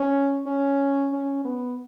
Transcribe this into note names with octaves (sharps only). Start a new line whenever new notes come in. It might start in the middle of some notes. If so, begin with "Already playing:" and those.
Already playing: C#4
C#4
C#4
B3